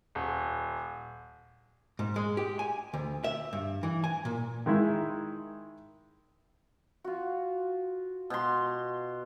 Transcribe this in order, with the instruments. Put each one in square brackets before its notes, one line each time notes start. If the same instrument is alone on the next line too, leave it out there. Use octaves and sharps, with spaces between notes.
[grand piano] D#1
[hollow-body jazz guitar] G#2
G#3
G4
G#5
D2
E5
G2
E3
G#5
A#2
[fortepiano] D#3 G#3 D#4 E4
[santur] F4 F#4
[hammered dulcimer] B2 C6